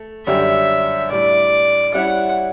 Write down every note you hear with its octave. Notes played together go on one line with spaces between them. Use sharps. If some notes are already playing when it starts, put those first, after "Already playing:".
Already playing: A3
F#2 D3 G3 C#4 G4 E5
A2 G3 D4 D5
G3 C#4 E4 F#5